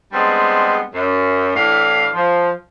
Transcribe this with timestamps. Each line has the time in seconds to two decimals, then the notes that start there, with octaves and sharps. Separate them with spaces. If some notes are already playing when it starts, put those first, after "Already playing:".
0.13 G3 G#3 B3 C4 D4
0.95 F#2
1.54 A2 E3 D4 F5
2.15 F3